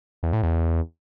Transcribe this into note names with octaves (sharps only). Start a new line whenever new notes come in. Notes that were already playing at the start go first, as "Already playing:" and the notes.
E2
A2
E2